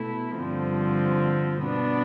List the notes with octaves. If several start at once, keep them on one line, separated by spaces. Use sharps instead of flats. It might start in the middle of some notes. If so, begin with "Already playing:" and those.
Already playing: B2 A3 E4
G2 D3 F3 C4
B2 B3 D4